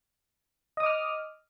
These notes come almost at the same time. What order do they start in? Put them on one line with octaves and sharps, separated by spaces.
D#5 D#6 D6 F6